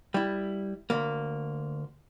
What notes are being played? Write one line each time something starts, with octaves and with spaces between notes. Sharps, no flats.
G3 E4
D2 A#3